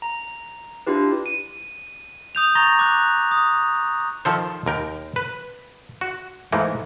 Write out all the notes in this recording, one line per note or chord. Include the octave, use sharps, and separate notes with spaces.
A#5
D4 E4 F4 G4 B4
D#7
D#6 G6 F7
A#5 C#6 G6 A6 A#6 F7
D6 F#6
D#6
D#3 F3 A4 C5
D#2 A#4 G5
B4
F#4
G#2 E3 A3 A#3